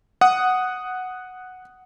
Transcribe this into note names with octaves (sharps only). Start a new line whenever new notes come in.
F#5 D#6